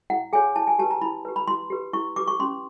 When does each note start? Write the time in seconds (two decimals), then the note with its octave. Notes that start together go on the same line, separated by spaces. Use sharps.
0.10 E4 F#5
0.33 G#4 C#5 G#5
0.56 E4 A5
0.67 G#5
0.79 G4 B4 A5
0.91 A#5
1.02 E4 B5
1.25 G4 B4
1.36 B5
1.48 E4 C6
1.70 G4 B4
1.93 E4 C#6
2.16 G4 B4 D6
2.27 C#6
2.39 C#4 C6